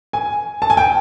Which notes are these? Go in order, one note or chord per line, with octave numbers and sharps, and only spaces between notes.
G#5
A5
G#5
G5